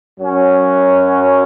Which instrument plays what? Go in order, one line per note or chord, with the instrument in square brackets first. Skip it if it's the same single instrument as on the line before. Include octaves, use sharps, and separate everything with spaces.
[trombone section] F#2 F#3 C#4 F#4